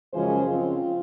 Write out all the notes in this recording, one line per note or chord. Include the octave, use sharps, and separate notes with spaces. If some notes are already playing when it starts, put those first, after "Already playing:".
F#2 C#3 F3 G#3 C#4 G#4 C5
C#3 F3 C4 F4